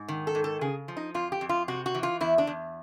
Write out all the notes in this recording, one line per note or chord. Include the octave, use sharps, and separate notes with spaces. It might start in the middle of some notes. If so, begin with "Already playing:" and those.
Already playing: G#2
D#3
A4
G#2
A4
C#3 G#4
F3
D#4
F2 F4
G4
F2
F4
C3 F#4
F#4
E3
F4
E2 E4
D4
E2